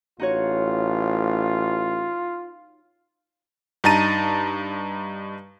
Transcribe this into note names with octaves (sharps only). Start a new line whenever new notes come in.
A1 D#4 F4 F#4 C#5
G2 D#4 A5 A#5 A6 D#7